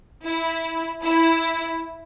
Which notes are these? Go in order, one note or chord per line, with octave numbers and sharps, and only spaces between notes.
E4
E4